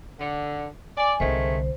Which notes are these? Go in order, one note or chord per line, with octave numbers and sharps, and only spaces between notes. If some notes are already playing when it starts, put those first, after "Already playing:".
D3
D5 G#5
C2 D3 D#3 G#3 A3 C5